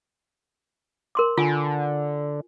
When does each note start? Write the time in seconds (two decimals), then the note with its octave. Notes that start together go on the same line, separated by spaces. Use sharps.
1.15 A#4 C6 D6
1.37 D3 F4 G#5